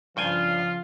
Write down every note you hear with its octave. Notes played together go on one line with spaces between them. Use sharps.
G2 C#3 F3 F4 G5 G#5 F6